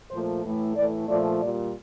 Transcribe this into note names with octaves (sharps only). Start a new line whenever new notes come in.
A#2 F3 A3 C5
A2 E3 A3
A2 E3 A3 D5
A#2 F3 A3 D5
A#2 G3 D5